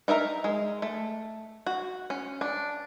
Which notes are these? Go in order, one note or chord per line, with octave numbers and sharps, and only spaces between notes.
D#4 A#4 E5 A#5
G#3
A3
F#4
C#4
D4